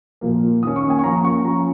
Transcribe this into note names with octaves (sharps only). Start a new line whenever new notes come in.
A#2 F3 A#3
D#3 A#3 C#4 D#6
C#6
G#5
C#6
F3 A#3 C#4 A#5
C#6
F3 C#4 A#5